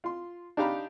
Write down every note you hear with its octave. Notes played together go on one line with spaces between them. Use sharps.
F4 C6
D4 D#4 G4 F5 A#5 B5